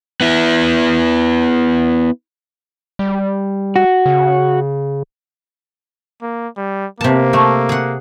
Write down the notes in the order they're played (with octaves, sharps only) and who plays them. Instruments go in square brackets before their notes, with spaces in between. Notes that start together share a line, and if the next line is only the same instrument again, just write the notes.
[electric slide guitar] B3 E4
[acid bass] G3
[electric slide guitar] F#4
[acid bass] C#3
[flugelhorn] A#3
G3
[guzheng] C3 A5 [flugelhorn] A#3
[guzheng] A3
G#4 F#5